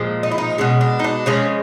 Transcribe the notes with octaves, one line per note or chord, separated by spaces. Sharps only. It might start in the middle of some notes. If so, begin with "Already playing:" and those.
Already playing: A#2 F3 G#3
D#4
E4
D#4
B2 G#3 C#4
D4
D#4
D4
C#3 F3 G#3 C#4